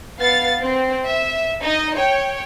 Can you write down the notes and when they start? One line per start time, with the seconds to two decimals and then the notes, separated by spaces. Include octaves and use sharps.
0.18 B3 F5 A6
0.61 C4
1.06 E5
1.61 D#4 D#5
1.96 C#5 G5